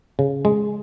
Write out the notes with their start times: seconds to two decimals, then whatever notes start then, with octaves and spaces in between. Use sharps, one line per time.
0.19 C#3
0.45 G#3